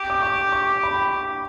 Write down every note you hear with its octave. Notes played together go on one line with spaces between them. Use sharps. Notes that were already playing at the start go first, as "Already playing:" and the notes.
Already playing: G4
D6
C#6
C#6
B5